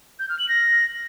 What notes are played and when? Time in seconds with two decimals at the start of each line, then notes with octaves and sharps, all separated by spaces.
0.19 G6
0.29 F6
0.39 F#7
0.49 A#6